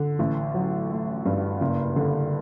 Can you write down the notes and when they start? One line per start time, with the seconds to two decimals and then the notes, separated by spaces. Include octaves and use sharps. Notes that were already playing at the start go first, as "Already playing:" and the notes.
Already playing: D3
0.19 A1
0.54 F#3
0.90 A3
1.26 G2
1.61 F#1
1.96 D3